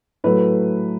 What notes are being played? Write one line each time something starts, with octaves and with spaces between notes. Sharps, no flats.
A2 F#3 A3 B4